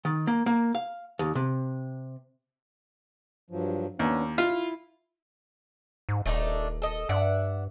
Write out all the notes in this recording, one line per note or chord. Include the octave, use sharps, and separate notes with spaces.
D#3
A#3
A#3
F5
D#2
C3
G2 F3 F#3
D#2 B3 C#4 D4
E4 F4
G#2
D#1 A3 D4 D#4
A4 D#5
G2 D5 E5 F#5